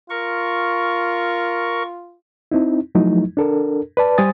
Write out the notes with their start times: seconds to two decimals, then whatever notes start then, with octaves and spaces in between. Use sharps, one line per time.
0.10 F4 A#4 C#6
2.51 C4 D#4 E4
2.95 F3 F#3 A3 D#4 E4
3.37 D4 A4 A#4
3.97 B4 D5 A5
4.18 G3 C5 G#5 D#6 A6